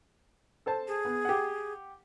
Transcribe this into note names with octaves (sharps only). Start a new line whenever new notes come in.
A4 C5 A5
G#4
B3
G4 F#5